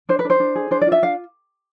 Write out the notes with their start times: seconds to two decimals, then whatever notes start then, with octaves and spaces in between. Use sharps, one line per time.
0.09 D4 C5
0.19 B4
0.25 D4
0.30 C5
0.40 D4
0.55 G#4
0.71 D4 C5
0.82 D5
0.87 F4
0.92 E5
1.02 D4 F5